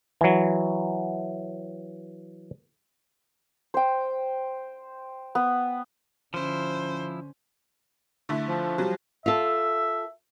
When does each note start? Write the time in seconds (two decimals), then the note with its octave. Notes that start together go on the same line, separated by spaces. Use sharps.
0.21 E3 F#3
3.74 C5 G5
5.35 B3
6.34 D3 F3 C#4 E4 C5
8.29 D3 A3 E4
8.48 F3
8.78 F#3 G3
9.26 F4 A4 E5